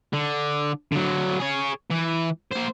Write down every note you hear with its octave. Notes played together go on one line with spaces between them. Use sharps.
D3
D3 F#3
G#4 C#5
E3
A#3 C5